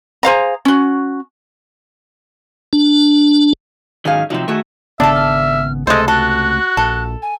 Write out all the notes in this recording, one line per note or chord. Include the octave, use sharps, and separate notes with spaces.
G#4 C5 F5 A#5
C#4 F#4
D4
G#2 D#3 F#3 C#4 G#4 F5
C3 F3 F#3 C4 D#4
D#3 A3 F#4 G#4
G#1 C#3 B3 D4 A4 E5 A5
F6
C#2 C3 G#3 A3 A4 C5 D#5
F#4 A4 F#6
A#1 A4
G#5